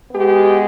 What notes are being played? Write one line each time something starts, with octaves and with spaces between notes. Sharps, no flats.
B2 G#3 B3 G4